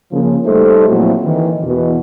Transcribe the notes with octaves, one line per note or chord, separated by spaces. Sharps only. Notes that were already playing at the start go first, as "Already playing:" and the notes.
C#3 F3 A#3
G3 A3 D#4 A4 C5
A#2 F3 F#3 C4 E4 F#4
D#3 E3
E2 B2 E3